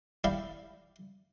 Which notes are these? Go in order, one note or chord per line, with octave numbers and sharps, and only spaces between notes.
E4 G4 D5 F5